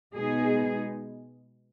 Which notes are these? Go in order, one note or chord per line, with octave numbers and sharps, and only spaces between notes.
B2 G#3 B3 D#4 G#4